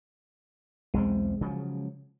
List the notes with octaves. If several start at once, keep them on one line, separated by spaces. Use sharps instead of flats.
B1 E2 G#3 C4
C#3 F3 F#3